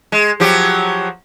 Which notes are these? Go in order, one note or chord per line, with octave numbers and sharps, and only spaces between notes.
G#3
F3 F#3 G4